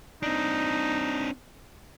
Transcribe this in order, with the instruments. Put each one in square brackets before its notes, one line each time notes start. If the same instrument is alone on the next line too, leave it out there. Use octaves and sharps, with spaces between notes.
[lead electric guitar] C4 D4 [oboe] D#4